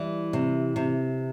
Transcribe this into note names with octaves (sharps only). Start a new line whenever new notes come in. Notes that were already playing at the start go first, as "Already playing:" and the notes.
Already playing: E3 G3
C3
C3